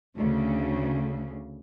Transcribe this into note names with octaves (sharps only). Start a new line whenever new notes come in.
D2 C#3